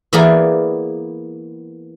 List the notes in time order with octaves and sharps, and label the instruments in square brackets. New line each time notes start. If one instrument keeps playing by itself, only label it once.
[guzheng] E3 A#3 B3 G#4 A#4 D5